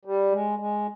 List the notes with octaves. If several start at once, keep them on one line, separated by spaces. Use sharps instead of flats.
G3
G#3
G#3